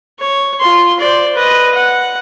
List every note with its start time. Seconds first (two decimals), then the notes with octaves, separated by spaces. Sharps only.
0.20 C#5
0.60 F4 C6
1.00 C5 D5
1.35 B4 D#5
1.74 F#5